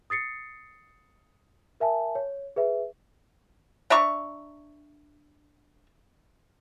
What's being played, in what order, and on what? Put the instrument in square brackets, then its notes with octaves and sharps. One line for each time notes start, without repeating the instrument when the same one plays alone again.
[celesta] D#6 A6 C7 C#7
A#4 E5 G#5 A5
C#5
G#4 B4 E5
[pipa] D4 E5 A#5 C#6